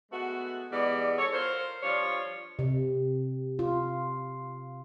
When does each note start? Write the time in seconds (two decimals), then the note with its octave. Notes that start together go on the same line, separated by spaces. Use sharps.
0.11 G#3 A3 B3 F#4
0.71 E3 G3 G#3 B3 D5
1.18 A4 C#5
1.32 F4 A#4 C5
1.82 F3 G3 D4 F4 C#5
2.59 C3
3.59 F4